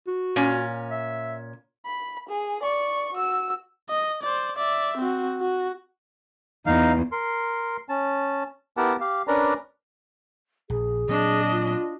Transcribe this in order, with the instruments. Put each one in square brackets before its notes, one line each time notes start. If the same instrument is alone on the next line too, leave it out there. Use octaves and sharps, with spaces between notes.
[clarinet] F#4
[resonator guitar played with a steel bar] A#2 C#4
[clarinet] E5
[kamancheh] B5
G#4
D5 C#6
F#4 E6
[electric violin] D#5
C5 D5
D5 E5
C4 F#4
F#4
[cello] E2 [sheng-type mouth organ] D#4 F5
[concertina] A#4 C6
C#4 A5
B3 E4 G4 A#4 F#5 A5
G4 F5
C#4 D4 A#4 B4 D5 A#5
[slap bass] A#1 [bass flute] G#4
[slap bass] A#2 F#3 C4 [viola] D4 D#5
[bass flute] F4